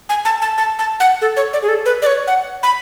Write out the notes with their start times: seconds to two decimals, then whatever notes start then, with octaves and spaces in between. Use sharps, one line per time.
0.09 G#5
0.25 A5
0.42 A5
0.58 A5
0.79 A5
1.00 F#5
1.21 A4
1.37 C#5
1.53 D5
1.62 G#4
1.69 A4
1.86 B4
2.02 D5
2.06 C#5
2.27 F#5
2.63 B5